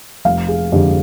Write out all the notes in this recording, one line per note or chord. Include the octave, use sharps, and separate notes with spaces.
F1 F5
G#4
F2 D3 G#3 G4